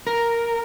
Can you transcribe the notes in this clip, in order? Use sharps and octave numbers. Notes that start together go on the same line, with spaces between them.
A#4